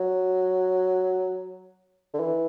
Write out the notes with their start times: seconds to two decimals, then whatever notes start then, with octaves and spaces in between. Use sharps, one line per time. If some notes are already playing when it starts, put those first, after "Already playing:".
Already playing: F#3
2.14 D3
2.20 E3